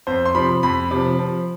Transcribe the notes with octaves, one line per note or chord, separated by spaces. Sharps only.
F2 C5
C6
C3 F3 B5
F2 B5
C3 F3
F3